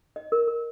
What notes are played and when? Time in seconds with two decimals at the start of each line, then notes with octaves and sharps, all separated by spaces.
0.16 D#5
0.32 A#4
0.48 A#4